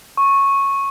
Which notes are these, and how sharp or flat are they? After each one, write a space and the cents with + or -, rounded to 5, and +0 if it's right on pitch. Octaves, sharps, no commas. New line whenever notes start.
C#6 -10